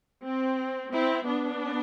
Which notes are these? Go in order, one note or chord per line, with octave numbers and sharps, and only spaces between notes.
C4
C4 E4
B3 D4